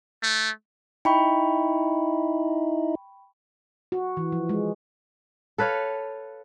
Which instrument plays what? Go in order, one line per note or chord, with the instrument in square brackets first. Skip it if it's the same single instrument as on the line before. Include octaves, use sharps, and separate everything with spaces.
[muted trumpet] A3
[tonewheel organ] D#4 E4 [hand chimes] G5 B5 C#6
[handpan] F#4
E3
F3
G#3
[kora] A4 B4 C#5 F5